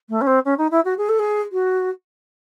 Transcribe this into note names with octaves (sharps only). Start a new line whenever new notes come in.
A3
C#4
C4
C#4
D#4
E4
F#4
G#4
A4
G#4
F#4